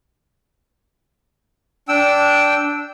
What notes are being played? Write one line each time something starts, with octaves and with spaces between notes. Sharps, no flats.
D4 G5 E6